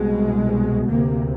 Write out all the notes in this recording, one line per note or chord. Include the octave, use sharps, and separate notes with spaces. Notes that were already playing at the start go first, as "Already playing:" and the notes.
Already playing: C2 B2 G#3
D2 C3 A#3